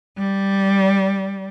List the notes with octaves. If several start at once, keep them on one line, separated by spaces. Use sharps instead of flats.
G3